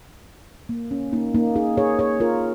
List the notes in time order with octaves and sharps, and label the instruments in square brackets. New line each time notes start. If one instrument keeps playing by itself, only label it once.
[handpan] A#3
C#4
A#3 D#4
A#3 D#4
D#4 G#4
G#4 C#5
G#4 C#5
F4 A#4